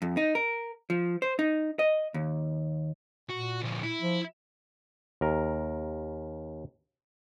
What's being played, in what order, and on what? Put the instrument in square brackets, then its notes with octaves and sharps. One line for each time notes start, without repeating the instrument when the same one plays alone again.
[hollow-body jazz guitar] F2
D#4
A#4
F3
C5
D#4
D#5
D#2
[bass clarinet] A#2 [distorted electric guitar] F#4
[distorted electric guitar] D2 F3
E4
[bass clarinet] F3
[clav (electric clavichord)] D#2 A#4